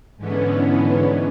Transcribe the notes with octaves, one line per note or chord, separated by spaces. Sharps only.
G#2 D3 E3 B3 C#4